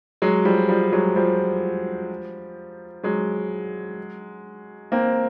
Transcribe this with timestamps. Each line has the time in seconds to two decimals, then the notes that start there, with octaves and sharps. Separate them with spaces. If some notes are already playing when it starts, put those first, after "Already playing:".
0.22 F#3 G#3
0.45 F3 G3
0.68 F3 G3
0.92 F#3 G#3
1.16 F3 G3
3.03 F#3 G#3
4.92 A#3 C4